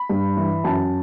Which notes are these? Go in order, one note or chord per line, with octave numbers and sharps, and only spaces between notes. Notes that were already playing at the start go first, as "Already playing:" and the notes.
Already playing: B5
G2
E3
F#2 A5